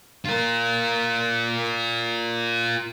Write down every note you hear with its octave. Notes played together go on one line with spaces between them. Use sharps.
F4 A#4